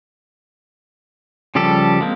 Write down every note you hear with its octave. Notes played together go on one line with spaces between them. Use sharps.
C#3 F3 G3 G4 A4
G#3 A#3 C4